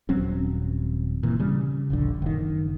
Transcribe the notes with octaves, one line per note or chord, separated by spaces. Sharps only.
D#1 F#3 C4 C#4
A#2 E3
C#3 G3
D#1 A#1 D3
F#1 D#3